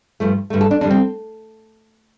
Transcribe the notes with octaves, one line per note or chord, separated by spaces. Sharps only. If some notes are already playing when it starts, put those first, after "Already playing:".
G2 F3 A3
G2 D3 A3
A4
D4
F2 D3 G3 D4
C4